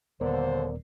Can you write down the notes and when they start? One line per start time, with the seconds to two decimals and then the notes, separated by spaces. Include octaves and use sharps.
0.21 D#1 D#2 D3 B3 A#4 C5 D5